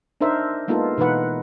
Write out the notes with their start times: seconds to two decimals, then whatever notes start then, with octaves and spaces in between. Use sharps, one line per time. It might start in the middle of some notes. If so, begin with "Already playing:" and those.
0.21 D4 D#4 A#4 C5 E5
0.68 G#3 A#3 B3 D#4 F4 A4
0.98 B2 E3 D#4 B4 F#5